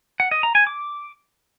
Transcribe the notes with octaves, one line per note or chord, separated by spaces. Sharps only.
F#5
D#5
A#5
G#5
D6